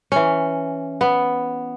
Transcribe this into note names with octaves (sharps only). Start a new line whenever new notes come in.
E3 C#4
B3